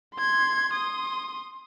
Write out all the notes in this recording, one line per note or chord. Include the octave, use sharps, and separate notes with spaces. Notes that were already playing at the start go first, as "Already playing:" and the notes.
C6 G#6
C6 D#6